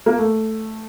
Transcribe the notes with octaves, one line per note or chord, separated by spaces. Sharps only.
A#3
A3